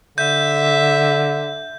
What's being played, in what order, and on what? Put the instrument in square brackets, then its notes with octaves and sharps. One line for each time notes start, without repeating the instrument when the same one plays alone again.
[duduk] D3 [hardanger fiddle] E5 [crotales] G6